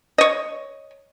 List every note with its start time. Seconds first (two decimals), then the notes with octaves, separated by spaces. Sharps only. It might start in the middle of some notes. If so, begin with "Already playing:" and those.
0.18 C#5 D#5